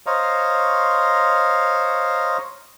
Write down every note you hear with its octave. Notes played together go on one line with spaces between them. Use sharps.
C5 C#5 D#5 F5 A#5